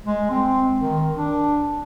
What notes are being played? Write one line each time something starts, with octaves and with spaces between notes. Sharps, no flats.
G#3
C4
D#3
D4